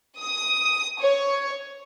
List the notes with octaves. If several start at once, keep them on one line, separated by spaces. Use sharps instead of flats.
D#6
C#5